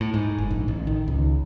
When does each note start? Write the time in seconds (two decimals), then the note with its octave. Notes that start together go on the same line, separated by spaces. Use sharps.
0.01 A2
0.14 G#2
0.38 F#1
0.51 A#1
0.68 A1
0.87 D#3
1.08 C#2